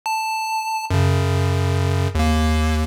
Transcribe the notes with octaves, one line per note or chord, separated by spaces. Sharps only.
A5
F#2 C#3
D#2 A#3